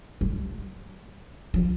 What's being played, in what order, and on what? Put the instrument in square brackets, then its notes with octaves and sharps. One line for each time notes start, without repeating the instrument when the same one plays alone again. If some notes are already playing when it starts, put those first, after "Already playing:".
[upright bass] G3
F3